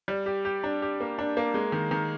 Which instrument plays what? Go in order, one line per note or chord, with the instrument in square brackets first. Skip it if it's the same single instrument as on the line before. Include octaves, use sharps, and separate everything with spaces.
[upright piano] G3
G4
G4
D4
G4
A#3
D4
A#3
G#3
D#3
D#3